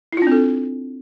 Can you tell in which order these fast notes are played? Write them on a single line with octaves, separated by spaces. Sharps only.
E4 F4 D4 C4 A4